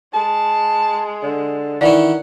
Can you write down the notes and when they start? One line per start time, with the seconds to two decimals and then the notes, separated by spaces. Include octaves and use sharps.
0.14 G#3 A5
1.22 D3
1.81 D#3 E3 C#4 D5 F#5